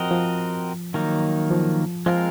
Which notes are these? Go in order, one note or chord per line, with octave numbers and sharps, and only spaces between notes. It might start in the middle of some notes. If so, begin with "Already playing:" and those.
Already playing: F3 C4 F#4 A#4 D#5
F3
D#3 F#3 A#3 D#4
F3
F3 G#3 C4 F4 A#4